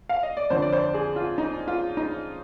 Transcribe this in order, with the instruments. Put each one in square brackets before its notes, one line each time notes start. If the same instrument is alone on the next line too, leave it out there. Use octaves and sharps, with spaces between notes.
[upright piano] F5
D#5
D5
F2 D3 F3 C5
D5
C5
G#4
F4
D#4
F4
D#4